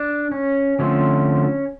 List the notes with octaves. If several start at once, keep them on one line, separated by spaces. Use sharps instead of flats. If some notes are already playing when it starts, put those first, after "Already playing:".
Already playing: D4
C#4
D3 F3 A3 C4 C#4